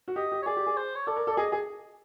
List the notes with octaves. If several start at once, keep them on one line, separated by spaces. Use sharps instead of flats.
F#4
G4 D#5
G4
C#5
G#4 D5
G4
G#4
C5
C#5
A4 D5
A#4
A4
D5
G#4 D#5
G#4